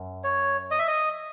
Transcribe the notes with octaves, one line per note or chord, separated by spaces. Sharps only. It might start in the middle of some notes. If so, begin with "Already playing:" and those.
Already playing: F#2
C#5
D#5
E5
D#5